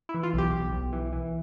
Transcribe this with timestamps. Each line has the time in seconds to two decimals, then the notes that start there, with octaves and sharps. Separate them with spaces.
0.09 E4
0.14 E3
0.23 F4
0.34 B1 G4
0.53 B1
0.72 B1
0.93 E3
1.13 E3